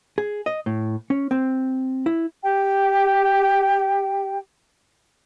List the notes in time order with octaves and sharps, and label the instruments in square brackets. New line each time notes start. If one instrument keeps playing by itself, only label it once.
[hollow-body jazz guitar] G#4
D#5
A2
C#4
C4
E4
[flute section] G4 G5